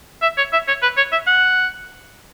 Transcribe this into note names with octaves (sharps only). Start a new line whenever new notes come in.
E5
C#5
E5
C#5
B4
C#5
E5
F#5